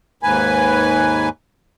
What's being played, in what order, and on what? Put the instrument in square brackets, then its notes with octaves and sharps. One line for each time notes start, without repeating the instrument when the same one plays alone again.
[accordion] D#2 G#2 B4 G#5